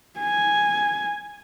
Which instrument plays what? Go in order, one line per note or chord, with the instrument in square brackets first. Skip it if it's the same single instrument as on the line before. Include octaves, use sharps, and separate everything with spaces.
[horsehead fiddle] G#5